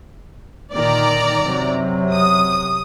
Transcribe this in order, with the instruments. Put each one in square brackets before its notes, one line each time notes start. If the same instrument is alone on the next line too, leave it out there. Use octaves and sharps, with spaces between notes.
[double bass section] A#2 D3 D#3 [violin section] D5 A#5
[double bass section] F#2 C3 F#3
[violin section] D#6